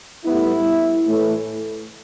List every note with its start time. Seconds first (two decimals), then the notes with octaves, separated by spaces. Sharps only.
0.25 A2 G3 B3 E4
1.05 A2 E3 A3